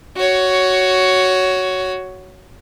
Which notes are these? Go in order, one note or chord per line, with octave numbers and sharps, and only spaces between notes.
F#4 C#5